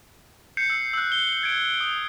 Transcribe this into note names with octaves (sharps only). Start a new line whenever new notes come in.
G6 C7 C#7
E6
E6 F#6
G7
G#6 D7
D#6